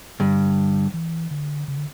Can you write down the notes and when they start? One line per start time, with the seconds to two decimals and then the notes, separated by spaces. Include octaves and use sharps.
0.20 G2 D3
0.94 E3
1.31 D3
1.68 C#3
1.77 D3